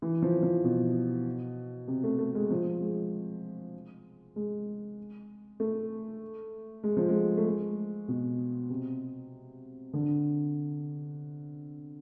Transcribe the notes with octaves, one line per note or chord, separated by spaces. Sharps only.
E3
F3
F3
B2
C3
A3
A3
G#3
F3
G#3
G#3
A3
G#3
F3
G#3
A3
G#3
B2
C3
D3